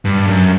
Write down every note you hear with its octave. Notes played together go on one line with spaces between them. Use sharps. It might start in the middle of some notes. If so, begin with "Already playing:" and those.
G2
F#2